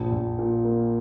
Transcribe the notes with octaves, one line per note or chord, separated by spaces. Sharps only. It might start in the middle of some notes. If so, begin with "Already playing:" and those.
Already playing: A#1
A#1
A#2
A#3